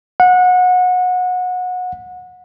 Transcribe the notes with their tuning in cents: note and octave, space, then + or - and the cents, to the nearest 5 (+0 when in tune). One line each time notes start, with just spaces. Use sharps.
F#5 -25